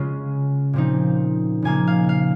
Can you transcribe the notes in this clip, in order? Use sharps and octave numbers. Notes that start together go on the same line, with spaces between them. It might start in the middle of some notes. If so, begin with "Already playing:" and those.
Already playing: C#3 G#3 C#4 F4
A#2 F3 C4 D#4
C#3 F3 A#3 D#4 G#5
F5
F5